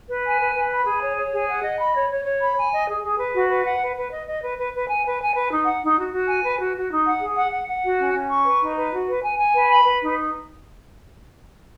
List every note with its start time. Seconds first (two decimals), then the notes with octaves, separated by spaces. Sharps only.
0.08 B4
0.24 G#5
0.40 B4
0.55 B4
0.70 B5
0.86 G#4
1.01 C#5
1.17 C#5
1.33 G#4
1.48 F#5
1.63 D#5
1.79 B5
1.94 C#5
2.10 C#5
2.26 C#5
2.40 B5
2.57 G#5
2.72 D#5
2.88 G#4
3.03 G#4
3.18 B4
3.33 F#4
3.49 B4
3.64 F#5
3.81 B4
3.96 B4
4.11 D#5
4.26 D#5
4.42 B4
4.58 B4
4.73 B4
4.88 G#5
5.04 B4
5.20 G#5
5.36 B4
5.51 D#4
5.66 F#5
5.82 D#4
5.97 F#4
6.12 F#4
6.28 G#5
6.43 B4
6.59 F#4
6.75 F#4
6.91 D#4
7.05 F#5
7.22 G#4
7.36 F#5
7.52 F#5
7.68 F#5
7.83 F#4
7.99 C#4
8.14 C#4
8.29 C#6
8.45 B4
8.61 D#4
8.76 B4
8.92 F#4
9.08 B4
9.22 G#5
9.38 G#5
9.54 B4
9.69 B5
9.84 B4
10.01 D#4